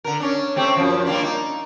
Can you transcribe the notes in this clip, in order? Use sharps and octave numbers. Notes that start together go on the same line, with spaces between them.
D3 A#4
C#4 D4
A3 C4 G4
F#2 F3
G3 A#3 D4
D#4